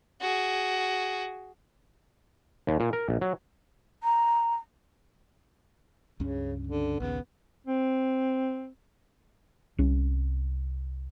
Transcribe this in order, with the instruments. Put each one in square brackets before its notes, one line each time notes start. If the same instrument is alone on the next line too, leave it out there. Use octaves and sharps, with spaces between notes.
[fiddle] F#4 G#4
[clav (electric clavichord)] D#2
A#2
A#4
A#1
F#3
[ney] A#5
[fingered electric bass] C#2 G2 C#4 [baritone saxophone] C#3
[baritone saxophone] D3
[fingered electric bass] A#1 D#2 C#3 [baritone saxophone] B3
[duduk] C4
[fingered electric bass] C2 C#4